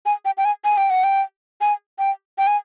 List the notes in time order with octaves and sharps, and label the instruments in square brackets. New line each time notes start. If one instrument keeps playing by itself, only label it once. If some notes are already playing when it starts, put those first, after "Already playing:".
[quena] G#5
G5
G5
G#5
G#5
G5
F#5
G5
G#5
G5
G5
G#5